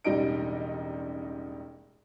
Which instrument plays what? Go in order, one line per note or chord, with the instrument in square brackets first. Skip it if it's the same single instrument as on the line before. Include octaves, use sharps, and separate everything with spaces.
[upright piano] E1 A1 G3 D#4 D#5 D7